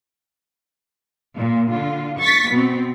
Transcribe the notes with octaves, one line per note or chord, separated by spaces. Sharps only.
A#2
D3 F4
C#6 A6 B6
B2 C4